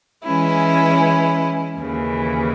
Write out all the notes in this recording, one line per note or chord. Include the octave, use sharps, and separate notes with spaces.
E3 G#3 C#4 E4
D#2 C#3 E3